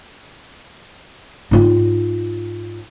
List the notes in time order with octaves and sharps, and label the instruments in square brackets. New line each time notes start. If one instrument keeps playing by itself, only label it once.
[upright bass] G#2 F4